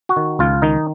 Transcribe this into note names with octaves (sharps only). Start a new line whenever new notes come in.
F#4
D#3
C#2 F4
D#3 D#4